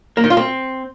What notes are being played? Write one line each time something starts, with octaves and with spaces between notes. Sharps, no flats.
A#3
D#3
F4
C4